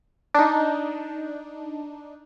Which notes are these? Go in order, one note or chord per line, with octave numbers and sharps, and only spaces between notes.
D4 D#4